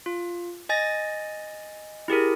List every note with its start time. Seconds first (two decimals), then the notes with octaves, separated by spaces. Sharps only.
0.06 F4
0.69 D#5 G#5 A6 A#6
2.08 E4 G4 G#4 A#4